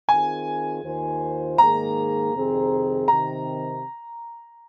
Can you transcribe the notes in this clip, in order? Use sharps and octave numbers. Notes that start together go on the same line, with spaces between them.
D#3 C4 F4 G#4 G#5
D#2 D#3 A#3 F4 C5
G#2 D#3 A#3 G#4 A#5
F2 C3 D#3 C4 G#4
C3 D#3 C4 A#5